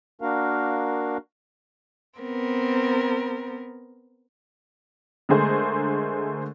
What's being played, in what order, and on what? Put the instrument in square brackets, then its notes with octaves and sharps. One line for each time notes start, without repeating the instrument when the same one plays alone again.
[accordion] A#3 D4 F#4 A#4 F5
[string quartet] B3 C4 A#4
[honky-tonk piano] D3 G#3 A3 G#4 A#4 C5